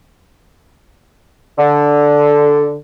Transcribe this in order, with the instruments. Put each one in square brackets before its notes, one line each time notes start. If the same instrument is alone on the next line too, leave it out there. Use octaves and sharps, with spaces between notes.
[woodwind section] D3